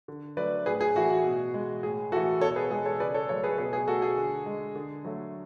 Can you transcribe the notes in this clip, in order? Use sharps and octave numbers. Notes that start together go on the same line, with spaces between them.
D3
F#3 A3 B4 D5
A2 G#4 B4
G#4
E3 A3 F#4
F#4
B2
G#3
A2 G#4
E3 A3 F#4 A4
B2 A4 C#5
G#4 B4
G#3 G#4
A4 C#5
C#3 B4 D5
A4 C#5
F#3 A3 A4 C#5
G#4 B4
B2 G#4 B4
G#4
A3 F#4 A4
G#4
D3
G#3
D3
F#3 A3